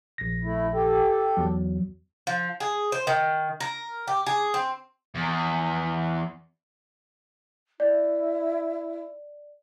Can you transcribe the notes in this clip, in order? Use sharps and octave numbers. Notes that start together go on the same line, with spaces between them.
A#1 A#6
A3 E4
G4 A4
E2 F#3
F3
G#4
C5
D#3
A#4
G4
G#4
C4
E2
E4 D5